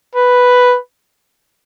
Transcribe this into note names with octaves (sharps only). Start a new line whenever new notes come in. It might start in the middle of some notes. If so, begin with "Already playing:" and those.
B4